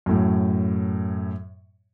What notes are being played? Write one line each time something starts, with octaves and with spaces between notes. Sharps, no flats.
F#2 A2